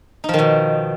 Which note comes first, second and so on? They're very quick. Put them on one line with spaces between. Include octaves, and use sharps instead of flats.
D#4 F3 D#3 B2